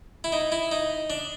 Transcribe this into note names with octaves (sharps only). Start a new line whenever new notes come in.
E4
D#4
E4
D#4
D4